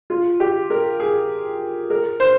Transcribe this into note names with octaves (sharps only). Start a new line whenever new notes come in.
F4
G4
A#4
G#4
A#4
C5